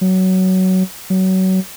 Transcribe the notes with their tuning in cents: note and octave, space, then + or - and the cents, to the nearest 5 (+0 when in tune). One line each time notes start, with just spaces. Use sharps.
F#3 +15
F#3 +25